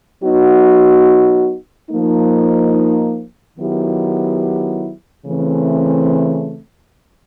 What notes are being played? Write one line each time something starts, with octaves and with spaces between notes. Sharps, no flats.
F#3 B3 D#4 F#4
F3 A#3 D#4
D#3 F#3 B3 E4 G4
C#3 E3 A3 C4